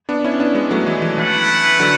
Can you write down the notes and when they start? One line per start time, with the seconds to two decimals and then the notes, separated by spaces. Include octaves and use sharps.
0.09 B3 D4
0.24 C#4 E4
0.40 B3 D4
0.55 G#3 B3
0.71 F#3 A3
0.86 E3 G#3
1.02 E3
1.17 E3 A3 E4 B4 F#5
1.79 D3 F#3